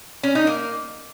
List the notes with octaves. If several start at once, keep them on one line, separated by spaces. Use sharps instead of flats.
C#4
D#4
A#3